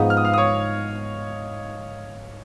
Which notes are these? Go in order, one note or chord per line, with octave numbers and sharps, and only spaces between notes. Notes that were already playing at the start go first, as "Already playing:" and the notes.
Already playing: G#2 F3 B3 D#5 D#6
F6
D#6
F5 F6
D#6
C#5 C#6